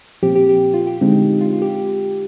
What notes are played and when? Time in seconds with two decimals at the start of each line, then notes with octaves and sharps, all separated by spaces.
0.23 A#2 F3 C4 G4
0.36 G4
0.49 G4
0.62 G4
0.74 F4
0.87 G4
1.01 D3 G#3 C4 D#4
1.41 F4
1.53 F4
1.62 G4